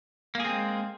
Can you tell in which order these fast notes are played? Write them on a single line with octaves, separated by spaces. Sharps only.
A#3 G#4 C4 G#3